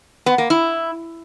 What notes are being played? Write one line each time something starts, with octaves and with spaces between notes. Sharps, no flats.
B3
A#3
E4